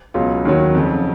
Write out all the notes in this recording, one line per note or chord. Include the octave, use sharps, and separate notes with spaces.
C#2 B2 F#3 F4
D#2 D#3 F#3
F2 C#3 F#3